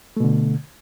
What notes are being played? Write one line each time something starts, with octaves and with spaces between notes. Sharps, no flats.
B2 D3 A3